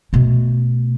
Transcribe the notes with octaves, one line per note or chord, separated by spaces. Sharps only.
B2 A3